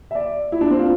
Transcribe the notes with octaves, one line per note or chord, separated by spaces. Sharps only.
E5
D5
E4
D4
C4
F4